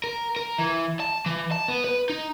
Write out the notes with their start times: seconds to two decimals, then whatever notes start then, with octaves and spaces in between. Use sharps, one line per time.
0.04 A#4
0.36 A#4
0.58 E3
1.00 A5
1.26 E3
1.52 A5
1.68 B3
1.84 B4
2.10 D#4